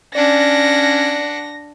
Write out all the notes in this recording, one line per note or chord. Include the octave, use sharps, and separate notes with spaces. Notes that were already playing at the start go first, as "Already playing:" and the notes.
C#4 D4 D5 F#5 A#6